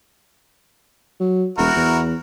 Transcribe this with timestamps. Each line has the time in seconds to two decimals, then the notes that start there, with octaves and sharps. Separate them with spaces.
1.20 F#3
1.58 E1 E4 F#4 A#4
1.75 E2